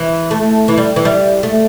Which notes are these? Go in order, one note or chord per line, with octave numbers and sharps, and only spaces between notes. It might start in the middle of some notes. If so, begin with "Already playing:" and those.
Already playing: E3
A3
E3
G3
E3
G3
A3